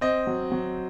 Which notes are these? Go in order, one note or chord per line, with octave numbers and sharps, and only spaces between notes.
C4 D#5
F#3
F#3